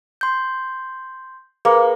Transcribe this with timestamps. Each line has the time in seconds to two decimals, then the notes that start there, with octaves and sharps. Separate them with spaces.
0.21 C6 G6
1.65 A#3 G#4 B4